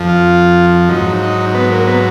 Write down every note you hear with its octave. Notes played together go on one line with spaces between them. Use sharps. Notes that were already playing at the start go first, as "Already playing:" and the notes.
Already playing: F2 F3
F4
G#2 F#3 D#4
D#4
B3
A#3
B3